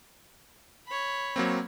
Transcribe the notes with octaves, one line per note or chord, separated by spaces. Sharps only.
C#5 B5
F#3 A#3 C4